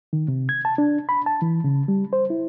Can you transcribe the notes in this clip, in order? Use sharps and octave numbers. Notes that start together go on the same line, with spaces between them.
D#3
C3
G#6
A5
D4
B5
A5
E3
C#3
G3
C5
E4